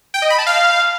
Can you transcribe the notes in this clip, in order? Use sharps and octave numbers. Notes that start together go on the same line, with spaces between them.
G5
D#5
B5
A5
F5